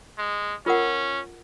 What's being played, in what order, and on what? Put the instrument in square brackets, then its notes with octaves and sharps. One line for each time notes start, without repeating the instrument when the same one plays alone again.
[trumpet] G#3
[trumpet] C#4 [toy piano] F4 A#4 F#5